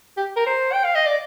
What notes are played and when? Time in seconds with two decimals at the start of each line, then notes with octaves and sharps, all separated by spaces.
0.17 G4
0.37 A#4
0.46 C5
0.73 G5
0.84 F5
0.95 D#5
1.06 D5